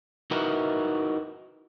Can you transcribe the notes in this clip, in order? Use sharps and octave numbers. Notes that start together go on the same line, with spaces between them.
D#4 E4 F#4 A#4 B4